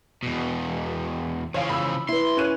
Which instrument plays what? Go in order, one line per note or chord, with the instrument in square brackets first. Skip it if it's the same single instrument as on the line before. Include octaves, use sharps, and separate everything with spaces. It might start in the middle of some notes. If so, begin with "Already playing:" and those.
[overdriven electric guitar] E2 B2
[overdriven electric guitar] C#3 F3 [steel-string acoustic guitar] E3 [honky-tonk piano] C#5 F5
[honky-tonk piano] B5 E6
[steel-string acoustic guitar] E4 B4 [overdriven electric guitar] C6
[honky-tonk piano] C#4 F#6 D#7